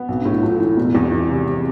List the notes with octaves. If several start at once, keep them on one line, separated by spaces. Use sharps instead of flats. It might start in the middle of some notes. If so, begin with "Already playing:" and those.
Already playing: B3
B1 C4
D4
A2
E4
A3 F4
E3 E4
E1 B3
E2 C4
E3
C3
C4